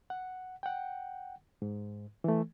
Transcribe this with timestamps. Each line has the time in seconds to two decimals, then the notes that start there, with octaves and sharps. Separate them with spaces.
0.10 F#5
0.63 F#5 G5
1.62 G#2
2.24 E3 A3